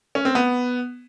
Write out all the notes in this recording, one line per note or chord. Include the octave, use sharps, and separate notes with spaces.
C#4
C4
B3